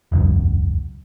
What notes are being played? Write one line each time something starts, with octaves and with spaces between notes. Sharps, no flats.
E1 C#2 F#2